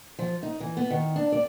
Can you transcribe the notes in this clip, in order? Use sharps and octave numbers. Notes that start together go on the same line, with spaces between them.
F3
D#4
E3
B3
D#3
D4
D5